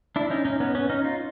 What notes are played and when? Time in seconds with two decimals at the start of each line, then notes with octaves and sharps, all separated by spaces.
0.16 D4 E4
0.30 C#4 D#4
0.45 C#4 D#4
0.60 B3 C#4
0.75 B3 C#4
0.89 C#4 D#4
1.05 D#4 F4